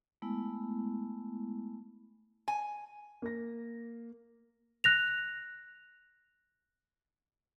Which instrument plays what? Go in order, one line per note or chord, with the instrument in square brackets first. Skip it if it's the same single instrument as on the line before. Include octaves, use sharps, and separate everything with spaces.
[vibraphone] G#3 A3 B3 E4
[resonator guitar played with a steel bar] G#5
[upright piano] A#3 A#6
[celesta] F#6 A#6 F7